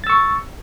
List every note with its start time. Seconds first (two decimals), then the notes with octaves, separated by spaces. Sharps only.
0.04 A6
0.07 E6
0.10 C#6